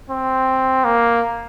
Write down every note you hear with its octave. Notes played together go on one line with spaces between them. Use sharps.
C4
A#3